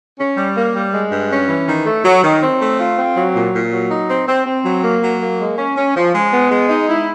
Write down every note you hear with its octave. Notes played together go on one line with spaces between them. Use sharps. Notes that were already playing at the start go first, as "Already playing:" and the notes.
C#4
G3
A#3
G3
G#3
G2
C#4
E3
D#3
A3
F#3
D#3
C4
A3
F4
C4
F#3
A#2
A#2
F#3
D#4
C4
C4
C4
F#3
A#3
F#3
A#3
G#3
C#4
C#4
F3
G#3
B3
G#3
D#4
E4